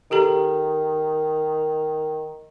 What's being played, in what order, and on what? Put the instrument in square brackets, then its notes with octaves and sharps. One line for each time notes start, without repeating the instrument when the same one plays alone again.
[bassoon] D#3 [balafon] G4 A4 A#5